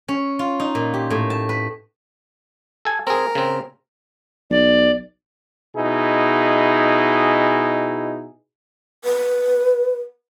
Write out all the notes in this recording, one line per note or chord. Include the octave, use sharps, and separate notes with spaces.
C#4
F4
D#4
A#2
G4
A2
A5
B4
A4 G#5
C4 G#4 A#4
C#3 C4
B1 D5
B2 D#4 E4 G#4
B4